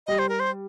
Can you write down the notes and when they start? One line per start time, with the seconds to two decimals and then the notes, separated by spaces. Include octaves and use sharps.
0.07 G3 D#5
0.19 C5
0.29 A#4
0.40 C5